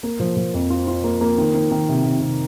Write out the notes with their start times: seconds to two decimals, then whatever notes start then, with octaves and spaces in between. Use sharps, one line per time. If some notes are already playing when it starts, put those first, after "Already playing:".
0.03 A#3
0.20 F3
0.37 F3
0.54 F2
0.70 F4
0.88 F4
1.04 A#3
1.21 A#3
1.38 D#3
1.54 D#3
1.71 D#3
1.89 C3
2.05 C3
2.22 C3